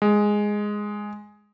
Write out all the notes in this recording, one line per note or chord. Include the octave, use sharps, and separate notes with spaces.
G#3